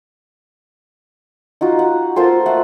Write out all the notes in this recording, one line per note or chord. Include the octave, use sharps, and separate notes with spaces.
D#4 F4 F#4
F#5
A#3 F4 A4 C5
A3 F#5